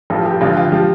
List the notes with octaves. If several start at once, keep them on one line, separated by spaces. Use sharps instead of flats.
A1 G2 F3 A4
G4
A1 G2 D3 F3 F4
F4
F3 G4